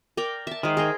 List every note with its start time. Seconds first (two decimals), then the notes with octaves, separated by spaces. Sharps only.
0.17 A#4 D5 G5
0.47 E5 A5
0.63 D#3 G#3 C5
0.77 G#4 A#4 G5